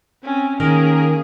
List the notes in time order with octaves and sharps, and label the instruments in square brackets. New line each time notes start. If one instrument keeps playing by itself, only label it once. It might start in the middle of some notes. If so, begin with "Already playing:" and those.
[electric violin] C4 [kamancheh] C#4
[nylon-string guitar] D#3 [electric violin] A#3 C#4 [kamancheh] G#4 [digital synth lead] A#4